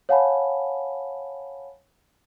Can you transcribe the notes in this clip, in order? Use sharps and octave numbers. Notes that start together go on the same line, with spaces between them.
C#5 F5 F#5 G#5 A5 B5